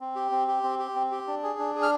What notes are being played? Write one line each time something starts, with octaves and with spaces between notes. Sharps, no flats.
C4
G4
C4
G4
C4
G4
C4
G4
D4
G#4
D4
G#4
F6